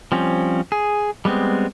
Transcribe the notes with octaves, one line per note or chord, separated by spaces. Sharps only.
F3 G3 C4 C#4
G#4
G3 G#3 B3 C4